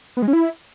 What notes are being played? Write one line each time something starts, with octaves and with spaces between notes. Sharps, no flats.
B3
G#3
C#4
E4